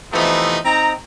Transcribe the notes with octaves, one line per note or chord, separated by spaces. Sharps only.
C3 E3 F3 A3 B3 D#4
C4 D#4 G5 A#5